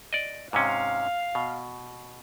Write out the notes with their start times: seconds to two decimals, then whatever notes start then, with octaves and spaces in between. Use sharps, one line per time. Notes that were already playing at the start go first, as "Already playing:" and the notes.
0.13 D5 D#5
0.53 G#2 C3 C#4 F5
1.35 B2